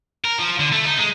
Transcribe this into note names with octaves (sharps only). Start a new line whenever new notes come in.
A#4
F3
D3
A3
D#4
G#3